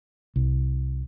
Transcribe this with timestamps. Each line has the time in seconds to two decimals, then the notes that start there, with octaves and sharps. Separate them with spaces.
0.36 C2